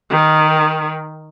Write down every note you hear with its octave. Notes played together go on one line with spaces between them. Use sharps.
D#3